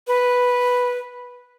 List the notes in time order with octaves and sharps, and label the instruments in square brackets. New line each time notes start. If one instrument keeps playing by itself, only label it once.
[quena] B4